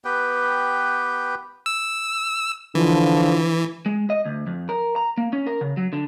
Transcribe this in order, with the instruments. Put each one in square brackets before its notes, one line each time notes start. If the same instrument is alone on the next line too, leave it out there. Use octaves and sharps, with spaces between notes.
[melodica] B3 G4 B4 G5
[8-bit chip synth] E6
[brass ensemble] D3 F3 [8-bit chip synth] E3
[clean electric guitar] G#3
D#5
D2
F2
A#4
A#5
A#3
C#4
A#4
C#3
F#3
D3